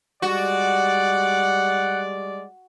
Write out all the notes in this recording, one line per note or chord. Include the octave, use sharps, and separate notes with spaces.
G3 G#3 F#4 D5 F#5